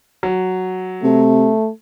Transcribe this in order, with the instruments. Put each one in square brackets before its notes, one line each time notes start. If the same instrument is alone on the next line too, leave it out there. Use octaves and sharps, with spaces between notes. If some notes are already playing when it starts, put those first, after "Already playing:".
[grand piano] F#3
[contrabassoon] C3 [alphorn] A3